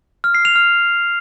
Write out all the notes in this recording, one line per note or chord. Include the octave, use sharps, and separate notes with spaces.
F6
C7
F7
F6